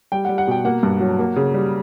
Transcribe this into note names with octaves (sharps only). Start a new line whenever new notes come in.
G3 G5
G3 F#5
F#5
B2 G5
A#3 F#5
G2
F#3
A#3
C#3
G3